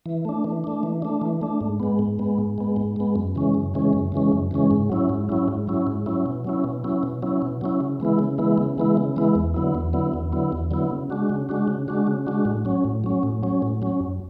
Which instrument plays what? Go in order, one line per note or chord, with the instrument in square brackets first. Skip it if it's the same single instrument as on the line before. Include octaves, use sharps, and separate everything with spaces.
[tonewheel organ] E3
A3 D4
E3
A3 D4
E3
A3 D4
E3
A3 D4
G#2
G#3 B3
G#2
G#3 B3
G#2
G#3 B3
G#2
G#3 B3
F#2
C#3 E3 G#3 C#4
F#2
C#3 E3 G#3 C#4
F#2
C#3 E3 G#3 C#4
F#2
C#3 E3 G#3 C#4
G#2
F#3 C#4 E4
G#2
F#3 C#4 E4
G#2
F#3 C#4 E4
G#2
F#3 C#4 E4
B2
F#3 C#4 E4
B2
F#3 C#4 E4
B2
F#3 C#4 E4
B2
F#3 C#4 E4
C#3
E3 G#3 B3 E4
C#3
E3 G#3 B3 E4
C#3
E3 G#3 B3 E4
C#3
E3 G#3 B3 E4
E2
D3 F#3 B3 E4
E2
D3 F#3 B3 E4
E2
D3 F#3 B3 E4
E2
D3 F#3 B3 E4
C#3
G#3 D4 F#4
C#3
G#3 D4 F#4
C#3
G#3 D4 F#4
C#3
G#3 D4 F#4
A2
F#3 C#4
A2
F#3 C#4
A2
F#3 C#4
A2
F#3 C#4
F#2